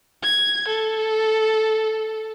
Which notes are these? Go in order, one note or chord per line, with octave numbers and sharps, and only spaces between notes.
G#6
A4